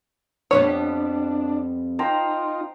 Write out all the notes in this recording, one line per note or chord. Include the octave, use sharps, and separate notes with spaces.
F2 G3 B3 D4 C#5
D#4 F4 C5 G5 A#5